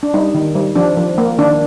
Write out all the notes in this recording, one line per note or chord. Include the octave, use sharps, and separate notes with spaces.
D4
G3 D#4
D#3
G3
F3 D4
F3
A#3
D#3 D4